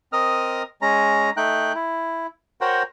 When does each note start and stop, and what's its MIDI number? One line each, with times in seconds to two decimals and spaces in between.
0.13 0.63 60
0.13 0.63 70
0.13 0.63 75
0.13 0.63 87
0.13 0.63 89
0.82 1.30 56
0.82 1.30 61
0.82 1.30 82
1.37 1.73 57
1.37 1.73 63
1.37 1.73 79
1.37 1.73 90
1.75 2.27 64
2.61 2.83 66
2.61 2.83 70
2.61 2.83 72
2.61 2.83 73
2.61 2.83 78
2.61 2.83 79